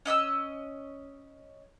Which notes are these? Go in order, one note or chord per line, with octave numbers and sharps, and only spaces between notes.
C#4 D#5 D#6 E6